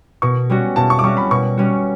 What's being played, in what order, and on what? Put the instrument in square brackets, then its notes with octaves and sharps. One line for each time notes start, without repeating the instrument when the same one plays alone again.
[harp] B2 [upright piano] C#6
[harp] G3 C#4 F#4
[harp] B2 [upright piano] A5
[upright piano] C#6
D6
[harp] G3 C#4 F#4 [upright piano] C#6
[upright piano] B5
[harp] B2 [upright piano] C#6
[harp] G3 C#4 F#4